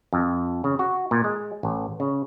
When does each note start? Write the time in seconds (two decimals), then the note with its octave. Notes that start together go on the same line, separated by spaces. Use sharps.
0.13 F2
0.64 C#3
0.79 F#4
1.11 A#2
1.24 G#3
1.63 A1
2.00 C#3